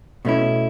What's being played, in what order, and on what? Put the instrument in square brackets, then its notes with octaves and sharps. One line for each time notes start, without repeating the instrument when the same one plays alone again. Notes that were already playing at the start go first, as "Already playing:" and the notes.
[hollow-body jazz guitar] B2 A3 C#4 E4